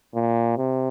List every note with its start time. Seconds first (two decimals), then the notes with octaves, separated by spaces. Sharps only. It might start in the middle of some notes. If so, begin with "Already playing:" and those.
0.15 A#2
0.57 C3